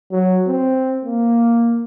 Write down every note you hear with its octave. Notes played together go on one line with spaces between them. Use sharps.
F#3
C4
A#3